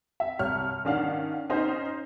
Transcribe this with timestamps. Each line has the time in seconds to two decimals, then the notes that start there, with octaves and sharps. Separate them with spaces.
0.20 E5
0.39 C2 C#5 F6
0.85 D#3 C#4 D4 F5 F#5
1.50 C#4 D#4 C5